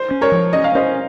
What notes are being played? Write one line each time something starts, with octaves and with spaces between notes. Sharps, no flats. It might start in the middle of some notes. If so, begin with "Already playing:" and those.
Already playing: C5
C#4
A#4 C#5
F3
C#4 D#5
F5
C#4 C5 D#5